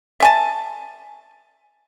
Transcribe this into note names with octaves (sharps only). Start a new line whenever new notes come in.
E5 G#5 A5